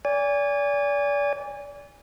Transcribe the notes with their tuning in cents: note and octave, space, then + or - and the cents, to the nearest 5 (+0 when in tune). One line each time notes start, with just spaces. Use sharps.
D5 -35 G#5 -25